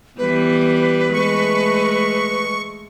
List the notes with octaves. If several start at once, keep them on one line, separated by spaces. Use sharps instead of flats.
E3 G3 B3 B4
G#3 A3 C#6